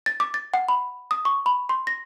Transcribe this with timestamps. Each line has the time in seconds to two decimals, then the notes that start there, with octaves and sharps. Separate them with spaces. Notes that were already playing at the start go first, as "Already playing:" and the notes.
0.06 A6
0.20 D6
0.34 A6
0.54 F#5
0.68 B5
1.11 D#6
1.25 C#6
1.46 B5
1.69 C6
1.87 A#6